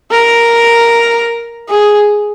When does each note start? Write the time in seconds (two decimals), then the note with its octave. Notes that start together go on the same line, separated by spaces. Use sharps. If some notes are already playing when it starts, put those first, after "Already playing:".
0.11 A#4
1.69 G#4